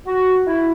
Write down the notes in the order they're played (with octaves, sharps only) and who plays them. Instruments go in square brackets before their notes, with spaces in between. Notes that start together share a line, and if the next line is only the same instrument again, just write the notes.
[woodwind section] F#4
E4